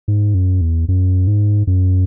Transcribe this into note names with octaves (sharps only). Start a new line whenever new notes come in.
G#2
F#2
E2
F#2
G#2
F#2